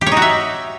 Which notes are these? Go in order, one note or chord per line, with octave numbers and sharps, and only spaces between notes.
G4
C#5
D#4
F#4
E5